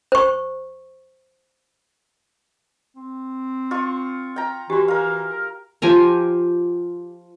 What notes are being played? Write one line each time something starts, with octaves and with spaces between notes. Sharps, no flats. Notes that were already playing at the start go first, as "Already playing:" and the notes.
C5 C#6
C4
F4 C#6
G5 A#5
E3 F#4 G4
E3 A#4 F5
A#4
F3 G4 G#5 A#5